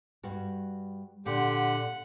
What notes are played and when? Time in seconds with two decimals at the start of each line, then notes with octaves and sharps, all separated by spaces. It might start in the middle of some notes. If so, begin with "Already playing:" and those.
0.23 G2 G3 F#4
1.26 A#2 D3 G4 F#5